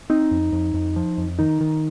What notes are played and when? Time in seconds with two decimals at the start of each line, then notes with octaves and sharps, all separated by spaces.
0.10 C4 D#4
0.31 F2
0.52 F2
0.74 F2
0.96 F3
1.18 F2
1.39 D#3 D#4
1.61 D#3